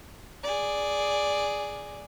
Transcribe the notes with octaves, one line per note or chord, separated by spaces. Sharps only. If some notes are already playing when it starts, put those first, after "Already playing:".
G#4 D5